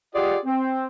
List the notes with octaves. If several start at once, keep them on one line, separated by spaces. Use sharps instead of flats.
F4 G4 G#4 D5 D#5 F#5
C4